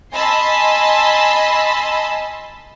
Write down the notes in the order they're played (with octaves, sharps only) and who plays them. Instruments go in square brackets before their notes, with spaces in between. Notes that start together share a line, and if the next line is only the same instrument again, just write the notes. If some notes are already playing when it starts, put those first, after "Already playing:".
[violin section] D#5 G#5 A5 B5 C6 E6